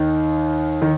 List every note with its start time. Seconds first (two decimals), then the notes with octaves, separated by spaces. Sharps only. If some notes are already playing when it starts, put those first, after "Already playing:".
Already playing: D#2 D#3
0.82 D#3